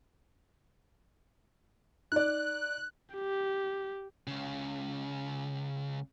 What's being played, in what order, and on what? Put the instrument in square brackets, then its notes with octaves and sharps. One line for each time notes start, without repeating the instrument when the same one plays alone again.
[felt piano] D#4 D5 [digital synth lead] F#6
[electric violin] G4
[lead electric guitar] C#2 C#3